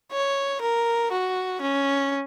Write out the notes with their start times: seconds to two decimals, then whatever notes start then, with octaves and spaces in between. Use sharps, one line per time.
0.12 C#5
0.61 A#4
1.12 F#4
1.62 C#4